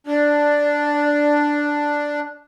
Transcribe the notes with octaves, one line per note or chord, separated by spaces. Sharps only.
D4 D5